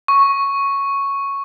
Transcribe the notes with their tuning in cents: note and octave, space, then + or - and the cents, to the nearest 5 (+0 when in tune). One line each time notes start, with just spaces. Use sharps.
C#6 +0